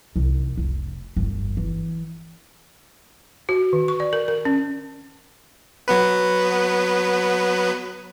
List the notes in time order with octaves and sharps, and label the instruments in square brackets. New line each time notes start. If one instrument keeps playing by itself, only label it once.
[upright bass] C2 D#3
F1
G1 F2
E3
[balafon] F#4
D#3
C#6
D5
A#4
A#4
C#4
[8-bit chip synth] F#3 B3 B4